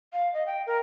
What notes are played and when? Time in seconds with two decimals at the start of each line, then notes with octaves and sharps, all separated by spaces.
0.13 F5
0.34 D#5
0.46 G5
0.67 A#4